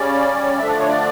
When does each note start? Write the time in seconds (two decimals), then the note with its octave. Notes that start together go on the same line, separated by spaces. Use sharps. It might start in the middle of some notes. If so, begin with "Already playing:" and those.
Already playing: C#3 G3 C#4 D5
0.59 D3 F3 A3 D4 E5
0.69 D5
0.79 C#5
0.88 D5